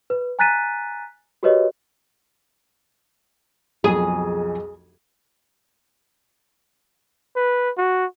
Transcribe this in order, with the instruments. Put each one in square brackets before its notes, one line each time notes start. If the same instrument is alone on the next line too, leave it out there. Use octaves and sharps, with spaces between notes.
[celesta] B4
G#5 A#5 F#6 A6 B6 D#7
F#4 G4 A#4 B4 C#5 D#5
[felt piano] B1 F2 G#5 [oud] G#4
[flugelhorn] B4
F#4